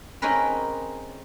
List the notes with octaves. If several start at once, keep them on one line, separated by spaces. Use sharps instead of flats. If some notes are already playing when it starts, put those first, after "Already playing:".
C4 C#4 D#4 G#4 A#4 B4